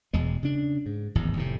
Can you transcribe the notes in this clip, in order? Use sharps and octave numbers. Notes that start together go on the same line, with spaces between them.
E1 E2 B2 G#3
C#3 D4
G#2
D1 G#1 E2
F1 A2 C3